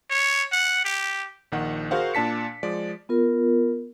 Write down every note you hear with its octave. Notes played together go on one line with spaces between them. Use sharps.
C#5
F#5
G4
A#1 D#3 F#5
F#4 G#4 A#4 C5 F5 F#5
A#2 D4 A5 B6 C#7
F3 G#3 D5
B3 F4 A#4